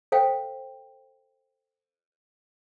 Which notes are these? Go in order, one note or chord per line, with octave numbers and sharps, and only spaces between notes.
A4 C5 F5 G5